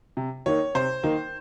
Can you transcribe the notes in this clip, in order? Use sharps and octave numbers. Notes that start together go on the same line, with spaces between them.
C3
D#3 A#3 D#4 C#5
C3 C5
D#3 A#3 D#4